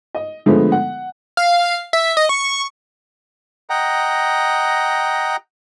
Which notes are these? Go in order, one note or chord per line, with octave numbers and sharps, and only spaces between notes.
D#5
D3 F3 G#3 A3 B3
F#5
F5
E5
D#5
C#6
D#5 F#5 G5 A#5